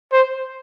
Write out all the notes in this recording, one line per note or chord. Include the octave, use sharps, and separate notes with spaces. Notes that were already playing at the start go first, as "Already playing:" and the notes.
C5